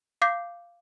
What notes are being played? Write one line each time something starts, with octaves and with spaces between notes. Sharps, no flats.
F5 D6 G6 C7